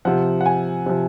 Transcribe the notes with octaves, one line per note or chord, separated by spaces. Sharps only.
C3 F3 F#5
F#5
G#5
C3 F3